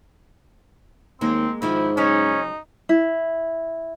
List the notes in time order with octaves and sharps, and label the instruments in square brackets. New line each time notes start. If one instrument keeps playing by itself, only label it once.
[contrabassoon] D#2 [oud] G#3 A#3 [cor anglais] C4
[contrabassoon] G#2 [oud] D#3 F3 [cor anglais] E4
[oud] C#3 F#3 G#3 [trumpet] C#4 [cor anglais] D#4
[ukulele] E4